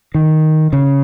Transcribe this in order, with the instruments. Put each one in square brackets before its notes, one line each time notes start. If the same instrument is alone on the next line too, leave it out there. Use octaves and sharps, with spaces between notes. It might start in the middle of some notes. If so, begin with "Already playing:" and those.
[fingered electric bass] D#3
C#3